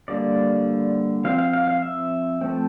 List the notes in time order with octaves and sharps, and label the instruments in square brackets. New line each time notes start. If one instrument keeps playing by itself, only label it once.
[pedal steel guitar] D3 G3 A#3 D5
F3 C4 F5
F5
F5
F5
E5
F3 A3 C4